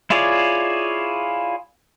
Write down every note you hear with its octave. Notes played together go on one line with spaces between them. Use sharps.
E4 F4 G#4 C#5 D5